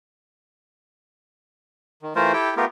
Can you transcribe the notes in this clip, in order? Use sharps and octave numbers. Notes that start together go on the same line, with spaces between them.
D#3
E3 A3 F4 A#4 C5
E4 G4 A4 G5
A3 B3 F4 G4 A#4